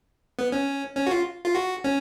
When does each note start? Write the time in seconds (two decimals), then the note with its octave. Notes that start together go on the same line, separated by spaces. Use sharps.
0.39 B3
0.52 C#4
0.96 C#4
1.07 F#4
1.11 F4
1.45 F4
1.55 F#4
1.84 C#4